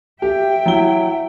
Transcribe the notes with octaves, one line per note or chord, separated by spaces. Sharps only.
G4 E5 G5
F#3 E4 G7